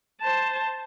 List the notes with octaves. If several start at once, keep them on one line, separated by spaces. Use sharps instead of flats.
C5 A5